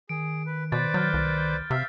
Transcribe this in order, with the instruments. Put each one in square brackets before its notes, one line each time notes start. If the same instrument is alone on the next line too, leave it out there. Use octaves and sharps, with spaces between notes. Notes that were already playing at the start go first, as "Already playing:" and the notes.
[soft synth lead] D#3 [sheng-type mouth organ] G#4 [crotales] D7
[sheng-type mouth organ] B4
[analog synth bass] B2 [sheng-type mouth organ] B4 C5 D5 [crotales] A6
[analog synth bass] F#3 [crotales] F6 G6 A6
[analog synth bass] C2
[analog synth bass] C3 [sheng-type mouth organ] E5 F5 [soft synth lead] E6